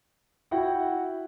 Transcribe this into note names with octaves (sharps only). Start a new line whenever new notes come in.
E4 F#4 F#5 G5